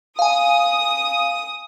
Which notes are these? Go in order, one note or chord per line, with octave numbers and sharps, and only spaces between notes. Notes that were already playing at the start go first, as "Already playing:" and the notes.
F5 G#5 D#6